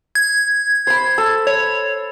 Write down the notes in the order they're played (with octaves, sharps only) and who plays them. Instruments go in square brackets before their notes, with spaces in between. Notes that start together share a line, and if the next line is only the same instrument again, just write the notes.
[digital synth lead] G#6
[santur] C5 B5
A4
[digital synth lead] C#5